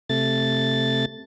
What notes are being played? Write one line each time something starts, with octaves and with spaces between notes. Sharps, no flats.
C3 A3 A6